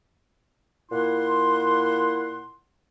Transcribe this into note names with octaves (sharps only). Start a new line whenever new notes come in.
A#2 E4 F#5 C6